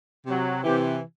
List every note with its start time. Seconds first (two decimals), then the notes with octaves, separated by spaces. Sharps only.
0.25 C3 F#3
0.62 C3 E3 G4